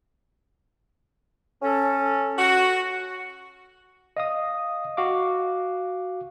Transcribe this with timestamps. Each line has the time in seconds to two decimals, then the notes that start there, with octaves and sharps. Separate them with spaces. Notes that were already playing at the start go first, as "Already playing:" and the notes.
1.62 C#4 A4
2.37 F#4
4.17 D#5 F5 D#6
4.97 F#4 F5 D6